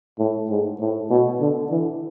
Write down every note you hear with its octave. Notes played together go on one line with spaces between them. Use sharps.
A2
G#2
A2
B2
D3
E3